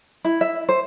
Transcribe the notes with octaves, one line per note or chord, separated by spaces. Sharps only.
E4
E5
C5